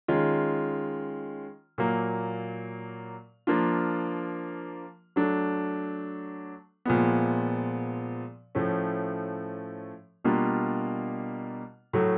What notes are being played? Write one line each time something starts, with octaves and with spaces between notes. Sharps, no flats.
D#3 G#3 C#4 F4
A#2 F#3 A#3
F3 A#3 D4 F4
F#3 A3 D4
A#2 F3 G#3 B3
A2 F3 A3 C#4
B2 G3 A#3 D4 F4
A2 F#3 A3